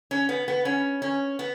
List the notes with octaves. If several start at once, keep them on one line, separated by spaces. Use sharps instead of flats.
C#4
B3
B3
C#4
C#4
B3